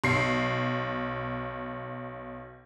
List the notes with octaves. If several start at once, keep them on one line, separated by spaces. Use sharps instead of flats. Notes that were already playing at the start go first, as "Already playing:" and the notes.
B1 C7